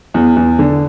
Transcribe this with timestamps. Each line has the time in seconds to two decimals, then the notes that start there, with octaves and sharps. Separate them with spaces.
0.14 E2
0.36 E2
0.59 D3